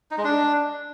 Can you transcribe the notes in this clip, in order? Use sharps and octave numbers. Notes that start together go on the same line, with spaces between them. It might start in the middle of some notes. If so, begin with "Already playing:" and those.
D#4
G#3
D4